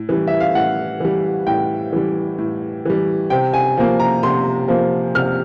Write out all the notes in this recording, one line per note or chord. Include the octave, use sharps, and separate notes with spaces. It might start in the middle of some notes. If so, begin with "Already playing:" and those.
Already playing: A2
E3 G3
E5
F5
A2 F#5
E3 G3
A2 G5
E3 G3
A2
E3 G3
C3 G5
G#5
F3 A#3
A#5
C3 C6
F3 A#3
C3 F6